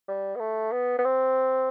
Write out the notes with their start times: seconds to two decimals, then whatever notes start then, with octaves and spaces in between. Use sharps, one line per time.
0.08 G3
0.36 B3
0.40 A3
0.72 B3
0.98 B3
1.05 C4